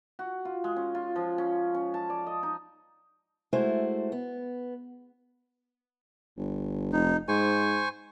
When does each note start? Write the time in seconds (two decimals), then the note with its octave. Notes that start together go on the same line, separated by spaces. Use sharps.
0.19 F#4
0.45 F4
0.64 G#3
0.76 C#4
0.95 F4
1.16 F3
1.38 C#4
1.75 C#4
1.94 A5
2.10 D5
2.27 D#5
2.43 D#4
3.53 G#3 A3 E4 F#4 C5
4.12 B3
6.37 G1
6.93 F1 D#4
7.28 G#2 C5 G#5 C#6